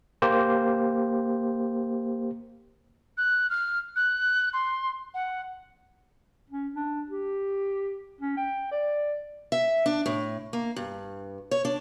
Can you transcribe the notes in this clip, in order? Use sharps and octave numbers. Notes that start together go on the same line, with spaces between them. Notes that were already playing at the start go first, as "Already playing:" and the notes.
A#3 G4 C5
F#6
F6
F#6
C6
F#5
C#4
D4
G4
C#4
G5
D5
E5
D4
A2
A#3
G2
C#5
D4